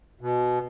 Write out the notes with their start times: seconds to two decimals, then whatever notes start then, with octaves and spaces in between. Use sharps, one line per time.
0.21 B2